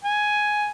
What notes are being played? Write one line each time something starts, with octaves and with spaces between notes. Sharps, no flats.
G#5